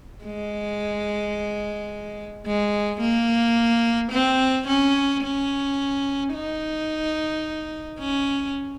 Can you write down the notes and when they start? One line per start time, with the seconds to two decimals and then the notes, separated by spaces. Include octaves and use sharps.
0.25 G#3
2.46 G#3
3.01 A#3
4.12 C4
4.68 C#4
5.24 C#4
6.34 D#4
7.99 C#4